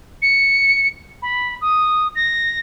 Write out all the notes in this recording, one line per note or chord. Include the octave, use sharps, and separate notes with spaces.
C#7
B5
D#6
A#6